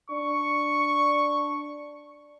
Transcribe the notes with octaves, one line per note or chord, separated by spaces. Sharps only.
D4 C#6